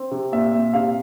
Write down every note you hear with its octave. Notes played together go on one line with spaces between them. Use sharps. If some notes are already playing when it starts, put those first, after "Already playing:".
Already playing: C4
C3
A#2 E5
A#2
C3 F5